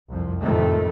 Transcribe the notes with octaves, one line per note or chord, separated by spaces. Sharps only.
C2 F2
F2 A2 C3 D#3 A3